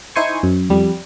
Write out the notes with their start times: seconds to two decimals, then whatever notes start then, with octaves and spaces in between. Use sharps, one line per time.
0.16 D#4 E4 C5 G#5 C#6
0.43 F#2
0.70 F2 G3